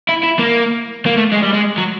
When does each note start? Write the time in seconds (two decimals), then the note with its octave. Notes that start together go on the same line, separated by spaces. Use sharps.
0.09 E4
0.23 E4
0.39 A#3
1.06 A#3
1.17 A3
1.32 G#3
1.42 G3
1.53 G#3
1.78 F#3